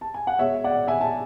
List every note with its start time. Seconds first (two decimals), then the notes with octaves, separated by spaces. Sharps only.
0.01 A5
0.14 G#5
0.27 F#5
0.39 B2 G#3 C#5 E5
0.64 D5 F#5
0.88 E5 G#5
1.01 A5